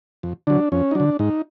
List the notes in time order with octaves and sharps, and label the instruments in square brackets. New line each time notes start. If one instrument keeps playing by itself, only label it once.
[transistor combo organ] F2
D3 F#3 D4
F2 C#4
D#4
D3 F#3 D4
G#2 D#4